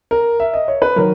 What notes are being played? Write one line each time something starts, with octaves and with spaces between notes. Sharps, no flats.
A#4
E5
D#5
C#5
B4
D#3 F#3 A#4